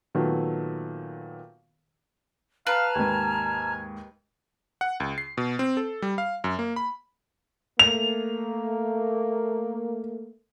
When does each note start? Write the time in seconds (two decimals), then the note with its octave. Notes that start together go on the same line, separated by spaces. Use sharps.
0.15 A#2 D#3 F#3 A3 B3
2.67 B4 F5 A5 A#5 F6
2.95 D#2 G#2 G#5
4.81 F#5
5.00 C#2
5.18 C7
5.37 B2
5.59 C4
5.77 A4
6.02 G3
6.18 F5
6.44 F#2
6.59 A#3
6.76 B5
7.79 A3 A#3 F7